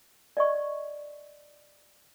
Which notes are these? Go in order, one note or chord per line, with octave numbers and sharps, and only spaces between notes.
D5 D#5 C#6